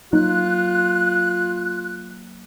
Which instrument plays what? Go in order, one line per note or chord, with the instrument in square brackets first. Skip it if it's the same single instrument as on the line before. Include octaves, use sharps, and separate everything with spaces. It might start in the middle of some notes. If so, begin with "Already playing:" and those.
[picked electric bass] F#3 A#3 [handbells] D#4 [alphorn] F4 [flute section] F#6